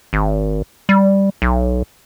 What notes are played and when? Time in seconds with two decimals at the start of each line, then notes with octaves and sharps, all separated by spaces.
0.13 G#1
0.89 G3
1.42 B1